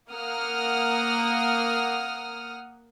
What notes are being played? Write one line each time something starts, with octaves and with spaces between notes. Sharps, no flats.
A#3 F#5 D#6 F6